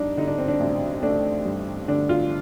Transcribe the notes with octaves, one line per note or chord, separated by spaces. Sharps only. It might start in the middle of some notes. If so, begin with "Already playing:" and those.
Already playing: G2 D4 D#4
D3 D#4
D4
C4
D4
A1
A3 D4
G2
D3 D4
F4